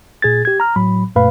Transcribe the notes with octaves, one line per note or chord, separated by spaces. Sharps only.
A#2 G#4 G#6 A6
G4 G#6
A#5 F6
A2 F#3 B5
F#2 A#2 A3 B4 F5 B5